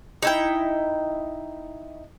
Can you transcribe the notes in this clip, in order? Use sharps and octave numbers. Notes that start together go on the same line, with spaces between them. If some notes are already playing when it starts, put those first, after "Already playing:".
D#4 E4 G5